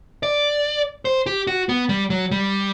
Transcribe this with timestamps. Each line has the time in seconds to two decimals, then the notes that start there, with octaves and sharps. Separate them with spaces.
0.23 D5
1.05 C5
1.26 G4
1.47 F#4
1.69 B3
1.89 G3
2.10 F#3
2.31 G3